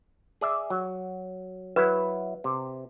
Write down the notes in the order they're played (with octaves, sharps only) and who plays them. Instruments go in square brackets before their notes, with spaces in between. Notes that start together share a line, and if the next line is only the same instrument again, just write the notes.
[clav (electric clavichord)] G#4 D5 E5
F#3
[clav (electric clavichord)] F#3 E4 [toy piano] B4
[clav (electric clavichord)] C3